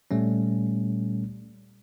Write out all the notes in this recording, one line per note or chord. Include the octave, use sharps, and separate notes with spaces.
A#2 G3 A3 C#4